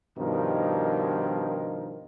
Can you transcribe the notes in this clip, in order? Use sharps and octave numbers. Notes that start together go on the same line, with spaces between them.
G2 B2 D#3 F3 D#4 A#4